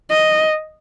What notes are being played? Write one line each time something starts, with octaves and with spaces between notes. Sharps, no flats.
D#5